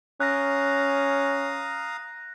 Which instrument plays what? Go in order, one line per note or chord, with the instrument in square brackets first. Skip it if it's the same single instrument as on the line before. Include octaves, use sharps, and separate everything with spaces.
[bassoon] C#4 [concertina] F5 A#5 D#6 [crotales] F#6 A#6